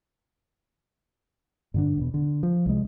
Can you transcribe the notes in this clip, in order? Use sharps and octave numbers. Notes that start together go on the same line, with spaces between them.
G2 D3 D4
E1 B2
D3
F3
C2 G#3